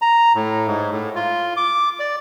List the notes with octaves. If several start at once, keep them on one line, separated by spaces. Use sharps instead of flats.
A#5
A2
G#2
A2
F4
D6
D5